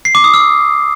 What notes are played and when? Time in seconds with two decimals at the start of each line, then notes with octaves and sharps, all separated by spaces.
0.05 C7
0.15 D6
0.24 D#6
0.34 E6